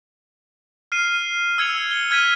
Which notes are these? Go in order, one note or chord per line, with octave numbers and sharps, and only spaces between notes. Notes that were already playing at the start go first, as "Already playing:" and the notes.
F6 C7 D#7
E6 G#6 C#7 F7
G7
F6 G#6 B6 D#7